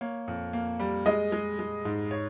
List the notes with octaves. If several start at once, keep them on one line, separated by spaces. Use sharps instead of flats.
A#3 C#5
F2
A#3
G3
G#3 D#5
G#3
G#3
G#2
C#5